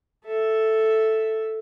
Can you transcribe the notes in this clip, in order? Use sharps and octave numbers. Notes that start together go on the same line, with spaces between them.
A4 E5